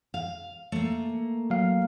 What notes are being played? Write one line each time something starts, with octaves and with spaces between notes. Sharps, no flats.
F5
A3 A#3
F#3 F5